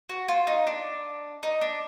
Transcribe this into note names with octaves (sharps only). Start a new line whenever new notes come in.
F#4
F4
D#4
D4
D#4
D4